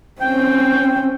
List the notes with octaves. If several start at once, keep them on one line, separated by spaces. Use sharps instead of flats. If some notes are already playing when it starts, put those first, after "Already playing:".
C4 C#4 G5